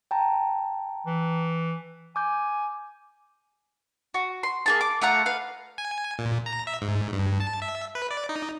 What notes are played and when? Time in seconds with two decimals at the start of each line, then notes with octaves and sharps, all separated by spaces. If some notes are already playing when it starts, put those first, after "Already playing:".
0.11 G5 A5 A#5
1.06 E3
2.16 G#5 D6 G6
4.14 F#4
4.43 C6
4.66 A#3 G#4 A5
4.81 D6
5.02 A3 F4 F#5 A#5
5.26 B4 F5
5.78 G#5
6.19 A#2
6.46 A#5
6.67 E5
6.82 G#2
7.13 G2
7.40 A5
7.62 E5
7.95 B4
8.11 D5
8.29 D#4